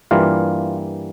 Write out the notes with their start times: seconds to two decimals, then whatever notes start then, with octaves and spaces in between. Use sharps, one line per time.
0.11 G2 E3 G3 A#3 F4 F5